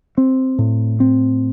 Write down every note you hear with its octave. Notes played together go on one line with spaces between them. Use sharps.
C4
A2
C4